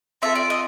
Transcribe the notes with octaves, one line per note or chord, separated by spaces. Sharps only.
C4 F4 A4 E5
D5
D#5